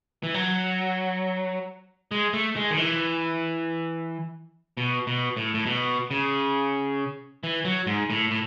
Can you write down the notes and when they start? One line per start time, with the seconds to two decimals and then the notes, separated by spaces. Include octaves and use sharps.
0.23 E3
0.34 F#3
2.11 G#3
2.33 A3
2.56 G#3
2.71 D#3
2.77 E3
4.77 B2
5.07 B2
5.37 A2
5.54 A2
5.66 B2
6.11 C#3
7.44 E3
7.65 F#3
7.87 G#2
8.10 A2
8.31 A2